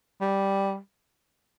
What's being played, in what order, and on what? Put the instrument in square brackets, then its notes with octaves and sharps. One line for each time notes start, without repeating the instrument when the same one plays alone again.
[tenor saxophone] G3